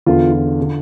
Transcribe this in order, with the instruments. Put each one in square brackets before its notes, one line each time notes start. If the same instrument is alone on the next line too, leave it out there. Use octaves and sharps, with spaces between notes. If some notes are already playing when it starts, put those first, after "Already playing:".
[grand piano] E2 D3 F4
F4
D3